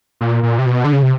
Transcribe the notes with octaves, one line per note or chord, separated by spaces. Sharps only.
A#2
A#2
C3
B2
D3
C#3
C3